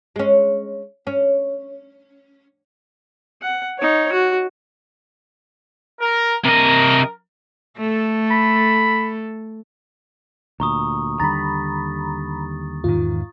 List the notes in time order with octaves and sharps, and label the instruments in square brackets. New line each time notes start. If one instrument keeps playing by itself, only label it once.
[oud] G#3 C#4
C#4
[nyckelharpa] F#5
D#4 C#5
F#4
[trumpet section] A#4
[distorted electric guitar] C3 D#5 [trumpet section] A#4
[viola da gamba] A3 A4
[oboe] B5
[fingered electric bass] D2 A#2 [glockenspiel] A#5 C#6 D#6
[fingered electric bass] D#2 D3 G3 [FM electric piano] A#5 B5 [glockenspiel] A6
[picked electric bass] E2 G#2 D#3 [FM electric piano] F4